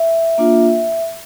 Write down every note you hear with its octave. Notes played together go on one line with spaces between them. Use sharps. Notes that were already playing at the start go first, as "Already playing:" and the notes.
Already playing: E5
A#3 D4 F4